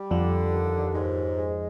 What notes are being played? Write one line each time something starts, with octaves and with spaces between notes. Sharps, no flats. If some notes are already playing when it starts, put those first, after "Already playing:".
Already playing: G3
F2 D3 F3
D#2
G#2
G#3